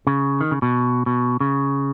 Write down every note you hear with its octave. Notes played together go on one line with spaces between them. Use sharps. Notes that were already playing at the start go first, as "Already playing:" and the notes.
C#3
D#3
C#3
B2
B2
C#3